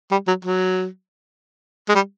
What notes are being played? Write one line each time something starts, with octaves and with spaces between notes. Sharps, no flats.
G3
F#3
F#3
G#3
G3